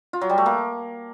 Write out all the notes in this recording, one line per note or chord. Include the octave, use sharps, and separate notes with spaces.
F4
F#3
G3
A3
A#3